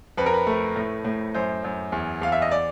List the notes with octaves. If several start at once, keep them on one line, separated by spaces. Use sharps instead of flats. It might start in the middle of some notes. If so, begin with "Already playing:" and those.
F2 B4
A#4
B4
A3
A2
A2
F#2 C5
F#2
E2
E2 F5
E5
D#5
D5